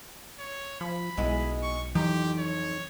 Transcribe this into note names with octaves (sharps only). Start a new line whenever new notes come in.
C#5
F3 B5
B1 G#3 B3 E4
C#6
F2 E3 F#3 D#4 G4
C#5